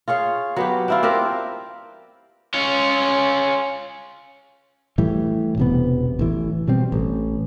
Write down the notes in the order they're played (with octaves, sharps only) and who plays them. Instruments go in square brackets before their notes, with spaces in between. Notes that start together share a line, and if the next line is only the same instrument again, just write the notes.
[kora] F4 G#4 C#5 F5
F#3 B3 G4
D4 E4 F4
C4 D4 G4 A#4
[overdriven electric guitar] C#4 F4
[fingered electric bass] A2 E3 G3
E1 C3 B3
A1 E3
B2 G3 C4
A1